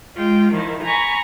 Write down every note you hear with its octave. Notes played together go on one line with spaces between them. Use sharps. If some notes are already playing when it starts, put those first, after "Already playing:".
G#3 F4 G5
D#3 F3 E4
G#5 A#5 B5 C#6